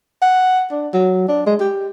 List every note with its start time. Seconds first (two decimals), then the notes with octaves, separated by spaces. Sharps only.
0.22 F#5
0.71 D4
0.94 F#3
1.28 D4
1.46 G#3
1.60 G4